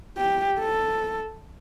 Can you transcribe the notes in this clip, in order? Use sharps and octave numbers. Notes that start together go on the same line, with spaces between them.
G4
A4